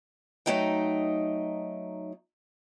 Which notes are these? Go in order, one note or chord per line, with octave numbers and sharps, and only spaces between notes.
F#3 A3 D#4 D#5 G5